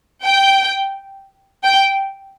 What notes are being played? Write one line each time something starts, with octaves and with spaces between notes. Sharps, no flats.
G5
G5